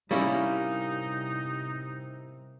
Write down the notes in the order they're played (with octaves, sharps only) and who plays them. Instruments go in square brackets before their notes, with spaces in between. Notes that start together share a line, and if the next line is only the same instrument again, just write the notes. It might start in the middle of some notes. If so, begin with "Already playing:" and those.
[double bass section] C3 [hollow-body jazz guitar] G3 E4 [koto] A#3 C#4 G5 [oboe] D#4